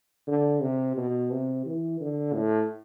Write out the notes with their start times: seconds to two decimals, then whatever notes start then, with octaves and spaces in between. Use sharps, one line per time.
0.28 D3
0.62 C3
0.97 B2
1.31 C3
1.66 E3
2.01 D3
2.34 A2